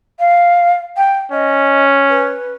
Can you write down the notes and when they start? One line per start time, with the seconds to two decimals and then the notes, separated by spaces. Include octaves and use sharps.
0.19 F5
0.97 G5
1.32 C#4 D#5
2.10 B4